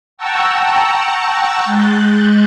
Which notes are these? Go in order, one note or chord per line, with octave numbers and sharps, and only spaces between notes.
F#5 G5 A5 A#5 C#6 E6
G#3 F#6 G6 A6